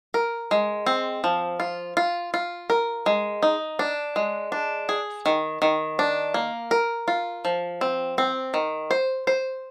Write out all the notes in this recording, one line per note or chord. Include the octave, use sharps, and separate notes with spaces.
A#4
G#3
C4
F3
F4
F4
F4
A#4
G#3
D#4
D4
G#3
D4
G#4
D#3
D#3
D4
A#3
A#4
F4
F3
C4
C4
D#3
C5
C5